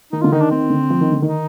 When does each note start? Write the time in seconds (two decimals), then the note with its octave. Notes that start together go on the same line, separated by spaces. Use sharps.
0.13 D#3 D#4
0.22 D3 F4
0.32 D#3 D#4
0.41 D4
0.51 D#3 C4
0.70 D3
0.90 F3
1.01 D#3
1.12 D3
1.22 D#3
1.28 D#4